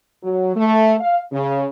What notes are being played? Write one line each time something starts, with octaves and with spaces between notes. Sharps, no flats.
F#3
A3
F5
C#3